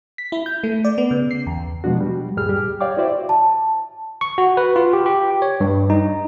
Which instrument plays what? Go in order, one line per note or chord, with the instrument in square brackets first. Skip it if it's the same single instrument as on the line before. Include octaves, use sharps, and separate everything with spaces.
[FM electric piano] B6
E4
G6
A3
D5
B3
C#3
C7
E2
[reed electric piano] B2 F3 G#3 D4 F#4
G3
D2 G2 A#2 G3 G#4 F6
G4
C#5 D5 F5 G5 D6
E4 F#4 C5 D5 E5
[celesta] A5
[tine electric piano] C#6
F#4
B4
F4
G4
G4
C#5
G2
D#4